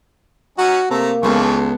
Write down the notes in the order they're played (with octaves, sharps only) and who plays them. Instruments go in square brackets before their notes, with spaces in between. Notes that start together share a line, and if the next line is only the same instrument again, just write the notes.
[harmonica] F#3 C#4 D#4 [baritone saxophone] F#4
[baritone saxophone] C3 [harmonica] A3 A4 A#5 [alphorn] A#3
[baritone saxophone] C#2 [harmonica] E3 F3 C#6 [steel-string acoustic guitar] G#3 B3 A4